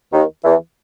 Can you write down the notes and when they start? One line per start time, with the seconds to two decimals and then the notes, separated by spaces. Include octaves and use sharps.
0.12 D#2 D#3
0.44 E2 E3